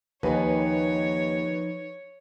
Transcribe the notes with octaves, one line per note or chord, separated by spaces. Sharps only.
D#2 F3 D#4 B4 C#5 G#5